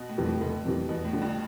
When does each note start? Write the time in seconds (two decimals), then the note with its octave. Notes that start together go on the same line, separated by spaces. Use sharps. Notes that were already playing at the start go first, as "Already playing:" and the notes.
Already playing: B2
0.09 A2
0.18 F2 C3 E3 G3
0.25 A2
0.41 F1 A2
0.65 F2 C3 E3 G3
0.89 E2 B2
1.05 A2
1.13 D3 F3
1.22 G2